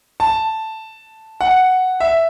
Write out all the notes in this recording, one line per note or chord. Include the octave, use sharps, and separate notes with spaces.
A5
F#5
E5